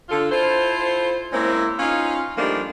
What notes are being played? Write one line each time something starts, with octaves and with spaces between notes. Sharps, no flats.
D3 F4 A4
E4 F4 A4 C5
G#3 A#3 C4 C#4 E4
C#4 D#4 F4 F5
F3 G3 A3 A#3 D4 D#4